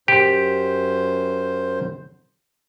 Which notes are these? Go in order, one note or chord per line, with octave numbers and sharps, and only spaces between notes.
F#2 G4 C5